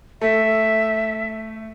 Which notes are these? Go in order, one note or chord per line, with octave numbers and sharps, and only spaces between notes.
A3 E5